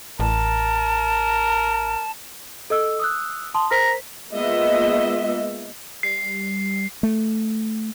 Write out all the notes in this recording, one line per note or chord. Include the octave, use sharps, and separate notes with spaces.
A1 A#4 A5
A4 D#5 E6
D#6 E6 F#6
A5 C6 D#6
A#4 C5 A#5 B6
G#3 A#3 B3 F4 D#5 E5
G3 C7
A3